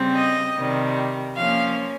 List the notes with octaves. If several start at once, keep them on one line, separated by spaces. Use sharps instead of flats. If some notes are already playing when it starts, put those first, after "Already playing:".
Already playing: C#3 G3 C4
D#5
C3 D#3 G3
F3 A#3 C#4 F5